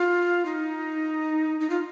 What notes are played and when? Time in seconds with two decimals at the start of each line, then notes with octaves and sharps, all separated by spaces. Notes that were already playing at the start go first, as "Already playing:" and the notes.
Already playing: F4
0.46 D#4
1.60 D#4
1.70 F4